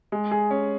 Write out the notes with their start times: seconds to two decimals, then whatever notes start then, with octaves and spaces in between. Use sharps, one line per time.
0.12 G#3
0.31 G#4
0.51 C#4